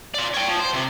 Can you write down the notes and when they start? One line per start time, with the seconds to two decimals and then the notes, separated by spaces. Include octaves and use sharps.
0.14 F4 D5
0.34 C#5 G5
0.48 F3
0.60 C5
0.73 C3